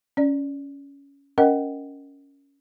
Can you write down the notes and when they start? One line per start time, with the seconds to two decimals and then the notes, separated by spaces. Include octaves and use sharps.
0.17 C#4 D5
1.38 C#4 A#4 D#5 F#5 G5